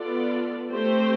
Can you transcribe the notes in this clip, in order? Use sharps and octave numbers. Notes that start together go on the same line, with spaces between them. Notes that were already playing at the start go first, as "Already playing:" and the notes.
Already playing: B3 F4 A4 D5
A3 C4 G4 C5